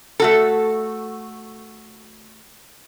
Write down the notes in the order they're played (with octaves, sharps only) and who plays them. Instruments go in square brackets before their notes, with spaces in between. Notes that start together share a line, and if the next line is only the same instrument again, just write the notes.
[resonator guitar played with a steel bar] A3 F#4 A4